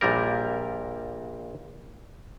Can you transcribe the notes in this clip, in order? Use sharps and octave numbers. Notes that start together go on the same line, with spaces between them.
A#1 A#2 G3 A#4